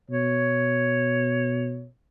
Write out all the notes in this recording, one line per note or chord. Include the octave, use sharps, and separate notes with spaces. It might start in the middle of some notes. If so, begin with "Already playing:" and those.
B2 C#5